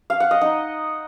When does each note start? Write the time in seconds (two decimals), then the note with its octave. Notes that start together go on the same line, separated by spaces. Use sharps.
0.10 F5
0.20 F#5
0.31 D#5
0.41 D#4